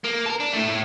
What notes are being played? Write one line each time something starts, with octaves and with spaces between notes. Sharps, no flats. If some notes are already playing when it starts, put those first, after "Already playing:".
A#3
A4 A#4
D4
A2 A3
A2